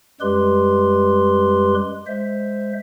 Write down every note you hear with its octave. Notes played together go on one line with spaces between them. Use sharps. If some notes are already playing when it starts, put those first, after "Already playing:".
F#2 G3 G#3 G4 B4 C6
G#3 C5 E5